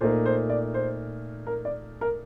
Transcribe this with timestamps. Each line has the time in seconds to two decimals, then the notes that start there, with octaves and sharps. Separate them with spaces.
0.01 A#2 A3 D#4 A#4 C5
0.26 C5
0.50 D5
0.74 C5
1.47 A#4
1.65 D5
2.01 A#4